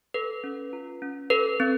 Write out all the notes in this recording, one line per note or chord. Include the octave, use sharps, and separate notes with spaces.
A4 B4
C#4
F4
C#4
A4 B4
C4